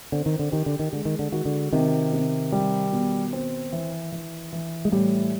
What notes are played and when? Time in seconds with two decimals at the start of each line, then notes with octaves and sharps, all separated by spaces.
0.12 D3 C4
0.26 D#3
0.39 D3
0.52 D#3 G4
0.66 D3
0.79 D#3
0.92 D3 G#3
1.05 D#3
1.19 D3
1.32 D#3 F#4
1.45 D3
1.73 C3 D#3
2.13 C3
2.52 G3
2.92 B2
3.33 C4
3.73 E3
4.12 E3
4.52 E3
4.85 G#3
4.92 A2 G3